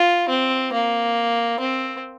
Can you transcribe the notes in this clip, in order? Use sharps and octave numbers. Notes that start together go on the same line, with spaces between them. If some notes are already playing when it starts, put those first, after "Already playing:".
Already playing: F4
C4
A#3
C4